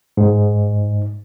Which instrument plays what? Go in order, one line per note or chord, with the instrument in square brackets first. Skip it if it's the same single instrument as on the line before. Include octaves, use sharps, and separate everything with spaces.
[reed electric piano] G#2